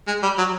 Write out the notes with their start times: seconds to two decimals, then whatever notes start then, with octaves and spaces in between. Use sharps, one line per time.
0.07 G#3
0.23 G3
0.38 F#3